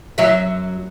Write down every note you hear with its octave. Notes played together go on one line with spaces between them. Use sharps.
F#2 F#3 E5